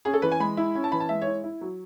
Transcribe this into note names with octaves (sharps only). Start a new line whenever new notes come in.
C#4 G#4
A4
E3 B4
G#5
G#3 B5
E4
C#4
A5
E3 B5
A5
G#3 E5
E4 C#5
E4
F#3